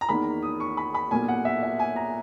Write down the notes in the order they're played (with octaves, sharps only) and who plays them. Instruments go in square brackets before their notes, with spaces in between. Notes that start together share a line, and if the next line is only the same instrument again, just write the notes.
[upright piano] A#5
E2 D#3 A#3 B5
D#6
C#6
B5
B5
B1 A#2 A#3 G#5
F#5
E5
E5
G#5
A#5